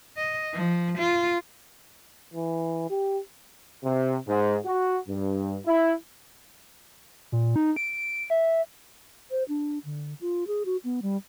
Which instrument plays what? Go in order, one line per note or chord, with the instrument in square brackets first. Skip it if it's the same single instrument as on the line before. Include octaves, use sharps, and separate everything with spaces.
[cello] D#5
F3
F4
[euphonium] E3
G4
[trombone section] C3
G#2
F#4
G2
E4
[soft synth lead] A#2
D#4
D7
E5
[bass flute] C5
D4
D3
F4
G#4
F#4
B3
G3